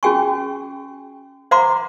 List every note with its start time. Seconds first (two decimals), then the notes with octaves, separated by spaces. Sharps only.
0.03 C#4 F#4 G#4 G5 G#5 C#6
1.51 C5 F5 F#5 A#5 C6 D6